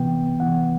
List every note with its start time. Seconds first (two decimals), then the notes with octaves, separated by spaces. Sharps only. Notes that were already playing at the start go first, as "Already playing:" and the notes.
Already playing: C3 E3 B3 G5
0.40 E3 B3 F#5